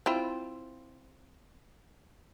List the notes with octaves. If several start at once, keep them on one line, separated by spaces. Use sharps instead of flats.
C4 E4 F4